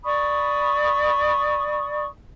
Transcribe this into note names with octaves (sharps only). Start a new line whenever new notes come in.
D5 B5 C#6 D#6